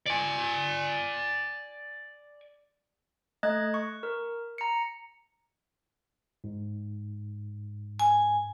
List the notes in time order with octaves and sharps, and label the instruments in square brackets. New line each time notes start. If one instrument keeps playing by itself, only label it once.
[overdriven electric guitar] D5 G#5
[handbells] A3 D#5 F#6 G#6
C#6
A#4
A#5 C#7
[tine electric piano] G#2
[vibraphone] G#5